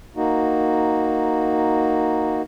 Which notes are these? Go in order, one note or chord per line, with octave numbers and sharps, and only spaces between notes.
A#3 D#4 F#4